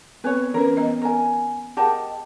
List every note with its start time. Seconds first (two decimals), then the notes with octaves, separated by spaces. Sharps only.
0.24 B3 C4 B4 C#5
0.54 E3 C#4 A#4 B4
0.76 B3 D#5 A#5
1.02 A#4 G#5
1.77 G4 G#4 A#4 D#5 F#5 A5